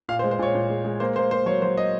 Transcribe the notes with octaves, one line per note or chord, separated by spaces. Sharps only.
A#2 F5
C5
G#3
C5
A#2 C#5
A#2
G#3
G#3
A#3 C5
A#3 C5
A#3 C5
F#3 C#5
F#3 C5
D#5